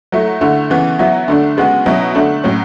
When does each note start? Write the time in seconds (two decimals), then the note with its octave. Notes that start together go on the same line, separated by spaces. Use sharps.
0.12 F#3 A3 E4
0.41 D3 A3 E4
0.70 C#3 E3 B3
0.99 F#3 B3 E4
1.28 D3 A3 D4
1.57 C#3 G#3 B3 F#4
1.86 B2 F#3 C#4 E4
2.15 D3 A3 D4
2.44 A2 F#3 C#4